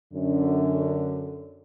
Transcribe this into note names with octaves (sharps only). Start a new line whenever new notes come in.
F#2 D3